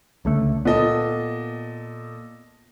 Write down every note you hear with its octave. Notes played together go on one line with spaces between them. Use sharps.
C#2 D3 A3
A#2 B3 A4 D#5